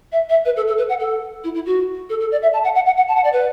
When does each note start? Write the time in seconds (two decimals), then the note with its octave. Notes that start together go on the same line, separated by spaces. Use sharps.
0.12 E5
0.29 E5
0.45 B4
0.56 A4
0.68 A4
0.78 B4
0.89 F#5
1.00 A4
1.44 E4
1.55 E4
1.66 F#4
2.10 A4
2.20 A4
2.32 D5
2.42 E5
2.53 A5
2.64 F#5
2.75 F#5
2.86 F#5
2.97 F#5
3.08 A5
3.16 F#5
3.24 D5
3.33 B4